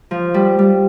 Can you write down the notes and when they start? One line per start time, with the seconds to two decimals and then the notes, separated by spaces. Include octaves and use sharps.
0.11 F3
0.34 G3
0.59 G3